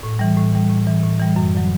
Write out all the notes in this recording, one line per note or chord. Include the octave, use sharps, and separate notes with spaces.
A2
E3 G3
A2
E3 G3
A2
E3 G3
A2
E3 G3
F#2
D3 F#3